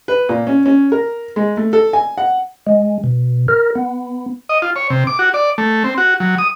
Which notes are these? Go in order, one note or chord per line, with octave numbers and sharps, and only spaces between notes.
B4
A#2
C#4
C#4
A#4
G#3
A3
A4
G#5
F#5
G#3
B2
A#4
B3
D#5
F4
C#5
C3
D6
F#4
D5
A3
C4
F#4
F#3
D#6